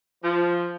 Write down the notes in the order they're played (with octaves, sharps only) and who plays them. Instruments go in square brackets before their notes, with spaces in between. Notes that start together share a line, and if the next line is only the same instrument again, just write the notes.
[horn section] F3